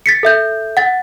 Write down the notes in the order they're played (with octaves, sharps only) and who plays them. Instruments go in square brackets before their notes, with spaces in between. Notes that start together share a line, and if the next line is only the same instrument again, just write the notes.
[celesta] A6 B6 C#7
A4 E5 G6
F#5 A6